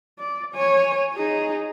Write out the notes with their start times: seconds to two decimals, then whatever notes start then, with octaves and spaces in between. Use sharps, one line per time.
0.19 D5
0.55 C#5 G#5
1.14 D#4 G#4